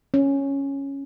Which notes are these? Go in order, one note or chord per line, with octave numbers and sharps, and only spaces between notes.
C#4